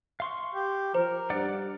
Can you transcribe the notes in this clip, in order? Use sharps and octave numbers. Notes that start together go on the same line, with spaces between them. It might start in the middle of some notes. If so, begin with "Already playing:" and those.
F5 C6 C#6
G4
F3 A#4 C5
G2 D5 F#5